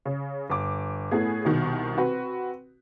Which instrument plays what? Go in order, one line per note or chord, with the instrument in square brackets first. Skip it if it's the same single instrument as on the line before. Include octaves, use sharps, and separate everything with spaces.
[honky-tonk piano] C#3
G1 D6
A2 A3 B3 G#4
C2 B2 D#3
C4 F#4 B4